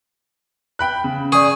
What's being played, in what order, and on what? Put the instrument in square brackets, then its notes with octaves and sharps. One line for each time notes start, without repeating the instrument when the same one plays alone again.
[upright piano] G5 B5 F#6
C#3
[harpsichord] G#4 [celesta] D5 C#6